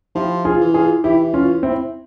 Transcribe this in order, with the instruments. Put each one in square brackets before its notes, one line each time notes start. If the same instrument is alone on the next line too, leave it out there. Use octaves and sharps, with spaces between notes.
[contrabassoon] F3 [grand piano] E4 G4
[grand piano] F4 G#4
[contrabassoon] E3
[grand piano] F4 G#4
[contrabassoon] E3 [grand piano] E4 G4
[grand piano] C#4 F4
C4 E4